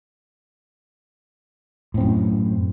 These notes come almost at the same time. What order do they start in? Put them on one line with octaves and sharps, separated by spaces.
A2 C4 F#2